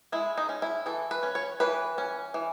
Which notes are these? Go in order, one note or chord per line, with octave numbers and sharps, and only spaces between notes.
G#3 E4
D#4
C#4
E4
E3 A4
B4
C#4
C#5
E3 B4
C#4
E3